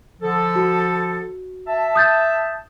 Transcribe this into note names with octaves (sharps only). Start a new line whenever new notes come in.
D3 F3 A4
F#4
E5 A5
D#6 G6 A6